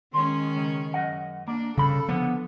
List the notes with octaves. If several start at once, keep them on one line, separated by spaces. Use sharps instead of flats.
D#3 G#3 C#4 C6
C#2
F#2 D#5 F#5
A#3 D4
G2 C#3 A4 B5
D3 F3 B3